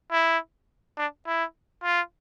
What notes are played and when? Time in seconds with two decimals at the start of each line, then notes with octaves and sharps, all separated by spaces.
0.12 E4
0.98 D4
1.27 E4
1.84 F4